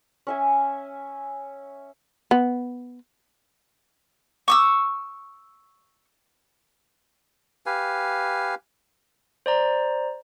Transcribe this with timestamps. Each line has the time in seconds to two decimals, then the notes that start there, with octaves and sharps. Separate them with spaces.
0.27 C#4 E5 G#5
2.31 B3
4.48 C#6 D#6 E6
7.66 G4 B4 F5 G#5
9.46 C5 D5 A#5